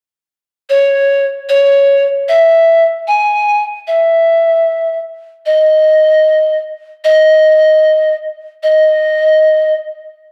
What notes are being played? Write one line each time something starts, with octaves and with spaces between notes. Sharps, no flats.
C#5
C#5
E5
G#5
E5
D#5
D#5
D#5